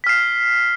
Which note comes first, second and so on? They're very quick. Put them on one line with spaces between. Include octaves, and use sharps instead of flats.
B6 F6 C7